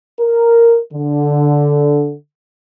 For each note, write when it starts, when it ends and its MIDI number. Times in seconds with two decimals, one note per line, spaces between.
0.20 0.80 70
0.93 2.15 50